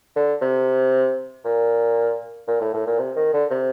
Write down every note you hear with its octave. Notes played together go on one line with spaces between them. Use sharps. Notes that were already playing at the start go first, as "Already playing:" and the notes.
D3
C3
A#2
A#2
A2
A2
A#2
C3
D#3
D3
C3